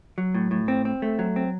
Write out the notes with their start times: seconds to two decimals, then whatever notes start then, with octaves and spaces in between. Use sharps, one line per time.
0.18 F#3
0.34 A2
0.51 A2
0.68 C4
0.85 C4
1.02 A3
1.19 F#3
1.36 C4